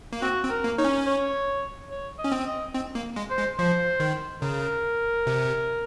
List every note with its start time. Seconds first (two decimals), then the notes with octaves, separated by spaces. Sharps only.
0.13 A#3
0.22 C4 F#4
0.43 C4
0.50 A#4
0.64 A#3
0.78 D#4 C#5
0.85 C#4
1.06 C#5
1.90 C#5
2.19 D#5
2.24 C#4
2.32 C4
2.46 D#5
2.75 C4
2.95 A#3
3.16 G#3
3.30 C5
3.37 G#3
3.59 F3 C5
4.00 D#3
4.42 C#3 A#4
5.27 C3